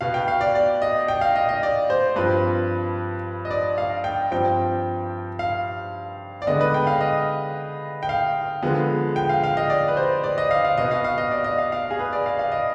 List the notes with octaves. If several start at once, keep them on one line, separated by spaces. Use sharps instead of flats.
B2 B3 F5
G5
F5
D5
D5
D#5
G5
F5
D#5
D#5
D5
C5
G2 F3 C4 B4
D#5
D5
F5
G5
G2 F3 C4 G5
F5
D5
D3 G#3 B3 D#5
B4
G5
F5
D#5
G5
F5
D3 F3 G#3 B3
G5
F5
F5
D#5
D5
B4
C5
D5
D#5
F5
F5
B2 B3 D#5
F5
F5
D#5
D5
D#5
F5
F5
G#4
B4
D5
F5
F5
D#5